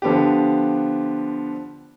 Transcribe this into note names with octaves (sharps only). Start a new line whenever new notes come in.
D3 F3 B3 D4 G4